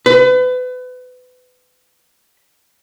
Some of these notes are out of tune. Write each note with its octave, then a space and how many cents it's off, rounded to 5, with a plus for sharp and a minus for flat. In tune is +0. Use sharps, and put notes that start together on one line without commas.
B4 +30